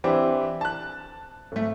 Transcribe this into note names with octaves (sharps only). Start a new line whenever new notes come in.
E3 C4 D4 E4 G4
A5 F#6
G#1 A3